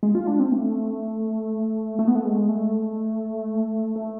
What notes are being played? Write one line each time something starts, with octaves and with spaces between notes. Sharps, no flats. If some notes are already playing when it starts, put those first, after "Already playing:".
G#3
F4
D4
C4
A3
A3
B3
A3
G#3
A3
A3